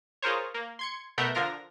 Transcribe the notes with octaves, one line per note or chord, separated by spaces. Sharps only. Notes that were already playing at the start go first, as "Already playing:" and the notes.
F4 G#4 A#4 C5 C#5
A#3
C6 G#6 C#7
B2 A3 A#4 E5 F#5 G6
D3 F3 F4 A#4 A#6